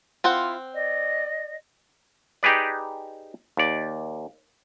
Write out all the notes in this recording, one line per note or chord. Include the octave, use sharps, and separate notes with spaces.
C4 E4 F4 C5 F#5
D5 D#5
D#4 G4 G#4 B4 D5
D#2 D5